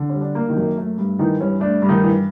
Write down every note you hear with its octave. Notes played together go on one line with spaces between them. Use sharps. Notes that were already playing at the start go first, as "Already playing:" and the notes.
Already playing: D3
G3 C#4
D4
A#3
D#3 D#4
F#2
A3
G2
D#3 E3 D#4
G2 C#4
A3 D4
G2
D#3 D#4
E3